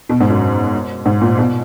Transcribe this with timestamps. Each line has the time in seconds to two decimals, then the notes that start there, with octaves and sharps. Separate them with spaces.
0.09 B2
0.20 G#2
0.30 F#2
1.06 G#2
1.21 A#2
1.38 B2